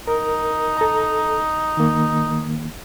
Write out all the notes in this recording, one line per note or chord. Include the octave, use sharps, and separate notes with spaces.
D#4 A#4
A4 A#5
D#3 A#3